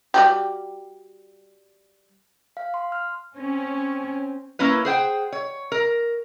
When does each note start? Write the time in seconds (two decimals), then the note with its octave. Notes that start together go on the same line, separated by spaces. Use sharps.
0.14 G3 F#4 G4
2.57 F5
2.74 C6
2.92 F6
3.36 C4 C#4
4.59 A#3 C#4 E4 B4
4.85 G#4 C5 F#5 G5
5.32 C#5
5.72 A#4